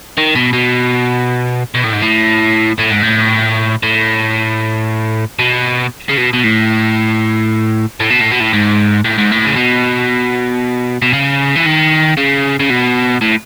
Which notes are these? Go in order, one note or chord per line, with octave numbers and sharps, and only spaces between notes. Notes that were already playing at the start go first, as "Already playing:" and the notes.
D#3
B2
B2
B2
A2
G#2
A2
A2
G#2
A2
A2
B2
C#3
B2
B2
A2
A2
B2
A2
B2
A2
G#2
A2
G#2
A2
C#3
B2
B2
C#3
E3
D#3
C#3
C#3
B2
A2